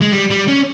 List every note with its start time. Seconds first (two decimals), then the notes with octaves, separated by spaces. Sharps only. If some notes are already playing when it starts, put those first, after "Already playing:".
0.01 G#3
0.12 G3
0.30 G3
0.48 C#4